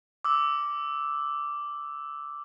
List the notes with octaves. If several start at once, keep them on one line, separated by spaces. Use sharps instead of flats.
D6 E6